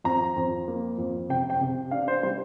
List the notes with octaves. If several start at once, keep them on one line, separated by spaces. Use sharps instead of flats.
F2 A#5
F2
A#3
F2
C3 G5
G5
C3
D4 F5
C5
G3 C5